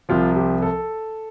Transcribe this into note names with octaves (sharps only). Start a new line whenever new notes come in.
C2 C3 F3 F4
G4
A4